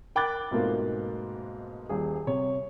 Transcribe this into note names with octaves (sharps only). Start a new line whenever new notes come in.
A#4 G5 B5 D6 F#6 A6
G#2 B2 A3 A#3 C4 F4
D#1 G#4
C3 C#5